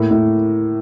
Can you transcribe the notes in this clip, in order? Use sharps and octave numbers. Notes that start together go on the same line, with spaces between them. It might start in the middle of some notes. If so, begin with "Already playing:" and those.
Already playing: A2 A#3
A2